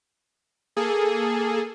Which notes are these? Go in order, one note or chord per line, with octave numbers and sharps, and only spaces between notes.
A#3 G#4 A4